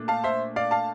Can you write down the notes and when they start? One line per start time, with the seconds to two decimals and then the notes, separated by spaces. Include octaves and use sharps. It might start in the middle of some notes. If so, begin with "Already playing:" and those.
Already playing: A#2 A3 D4
0.08 F5 A5
0.24 C5 E5
0.56 D5 F5
0.71 F5 A5